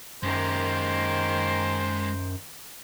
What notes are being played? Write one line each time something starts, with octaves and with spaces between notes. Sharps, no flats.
F#2 D#3 G#3 A#3 G4 C5